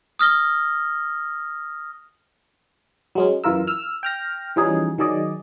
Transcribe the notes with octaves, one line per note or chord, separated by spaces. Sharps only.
D#6 F6 A#6 G7
F#3 G#3 C#4
F#2 E3 F4 A#4 E6
E6 F6
G5 F6 A#6
E3 F3 G3 C#4 D#4 G#4
D#3 F#3 G#4 D5 D#5